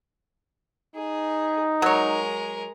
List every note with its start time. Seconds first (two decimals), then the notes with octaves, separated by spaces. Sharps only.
0.96 D#4 G#4
1.82 F#3 G#3 A#4 C#5